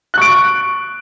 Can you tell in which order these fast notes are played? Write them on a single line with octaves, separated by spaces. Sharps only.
F#6 C#6 D7